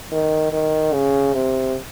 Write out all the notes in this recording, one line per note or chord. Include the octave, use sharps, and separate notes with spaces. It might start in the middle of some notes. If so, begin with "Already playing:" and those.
D#3
D#3
C#3
C3